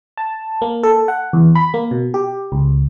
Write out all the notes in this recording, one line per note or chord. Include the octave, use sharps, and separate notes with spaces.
A5
A#3
A4
F#5
E2
B5
A#3
B2
G4
C#2